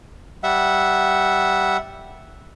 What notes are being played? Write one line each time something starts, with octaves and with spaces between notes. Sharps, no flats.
G3 E5 F#5